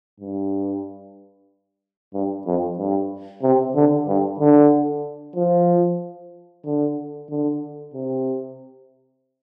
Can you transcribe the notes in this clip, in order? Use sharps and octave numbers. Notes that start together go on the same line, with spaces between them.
G2
G2
F2
G2
C3
D3
G2
D3
F3
D3
D3
C3